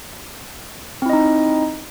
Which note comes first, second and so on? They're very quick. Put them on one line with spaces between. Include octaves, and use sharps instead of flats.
C4 E4 D#5 D#4